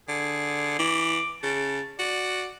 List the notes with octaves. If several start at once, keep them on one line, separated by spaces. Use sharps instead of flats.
D3 G#4
E3 D6
C#3 A5
F#4 D5